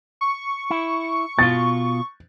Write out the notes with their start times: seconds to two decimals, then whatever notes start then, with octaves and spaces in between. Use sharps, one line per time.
0.21 C#6
0.71 E4
1.39 B2 F4 A6